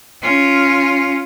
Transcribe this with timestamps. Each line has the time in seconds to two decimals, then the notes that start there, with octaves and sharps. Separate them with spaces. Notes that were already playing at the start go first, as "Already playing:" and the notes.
0.22 C#4 F4